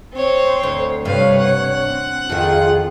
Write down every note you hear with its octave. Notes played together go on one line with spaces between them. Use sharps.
C4 C5 C#5
D2
G2 C3 B4 C#5 F5
F#5
C4
F2 D#3 F4 G#4